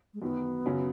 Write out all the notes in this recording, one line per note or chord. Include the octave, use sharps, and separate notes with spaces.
G#3
F#2 D#3 F#3 B3
F#2 C#3 F#3 C#4 F#4